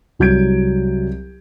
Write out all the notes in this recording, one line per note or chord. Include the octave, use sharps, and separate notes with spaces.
C2 F#3 G6 G#6 D7